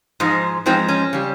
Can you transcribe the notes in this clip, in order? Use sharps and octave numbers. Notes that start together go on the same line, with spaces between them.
G#2 F3 G#3
G#2 F3 G#3 C4
C#4
C#3 G3